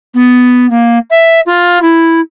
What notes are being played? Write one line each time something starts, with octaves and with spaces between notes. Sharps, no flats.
B3
A#3
E5
F4
E4